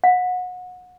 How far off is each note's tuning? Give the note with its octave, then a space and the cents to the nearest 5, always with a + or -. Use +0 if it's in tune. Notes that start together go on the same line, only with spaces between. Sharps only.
F#5 -30